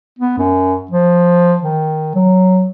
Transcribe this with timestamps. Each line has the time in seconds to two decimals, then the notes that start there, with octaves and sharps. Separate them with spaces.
0.19 B3
0.38 F#2
0.91 F3
1.62 D#3
2.15 F#3